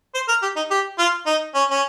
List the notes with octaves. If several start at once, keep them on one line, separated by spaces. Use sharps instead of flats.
C5
A#4
G4
D#4
G4
F4
D#4
C#4
C#4